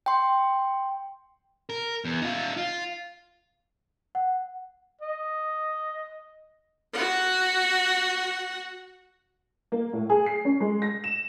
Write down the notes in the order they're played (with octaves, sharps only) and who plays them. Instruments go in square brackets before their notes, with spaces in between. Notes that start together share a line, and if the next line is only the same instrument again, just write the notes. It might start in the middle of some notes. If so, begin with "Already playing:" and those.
[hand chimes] G5 C6
[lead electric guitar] A#4
E2
D#4 F4
F4
[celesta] F#5
[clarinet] D#5
[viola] F#4 F#5
[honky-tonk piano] A#3
A2
G#4
C7
C#4
G#3
A#6
E7